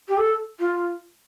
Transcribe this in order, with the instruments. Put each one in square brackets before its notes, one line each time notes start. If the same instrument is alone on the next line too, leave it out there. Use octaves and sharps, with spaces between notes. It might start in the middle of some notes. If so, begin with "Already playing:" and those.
[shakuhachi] G4
A4
F4